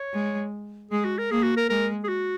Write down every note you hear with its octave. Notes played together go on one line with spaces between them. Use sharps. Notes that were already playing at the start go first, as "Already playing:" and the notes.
Already playing: C#5
G#3
G#3 G#4
F#4
A#4
A#3 G#4
F#4
A#4
G#3 A#4
G#4
F#4